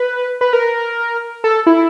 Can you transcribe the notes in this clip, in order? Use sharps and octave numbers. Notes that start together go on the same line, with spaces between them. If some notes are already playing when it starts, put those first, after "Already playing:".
Already playing: B4
B4
A#4
A4
E4